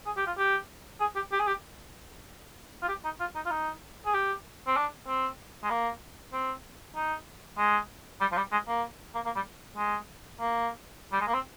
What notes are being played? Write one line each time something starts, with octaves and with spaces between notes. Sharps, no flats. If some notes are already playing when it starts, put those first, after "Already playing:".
G#4
G4
F4
G4
G#4
G4
G4
G#4
G4
F4
G4
D#4
F4
D#4
F4
D#4
G#4
G4
C4
D4
C4
G#3
A#3
C4
D#4
G#3
G3
F3
G3
G#3
A#3
A#3
A#3
G3
G#3
A#3
G3
G#3
A#3
C4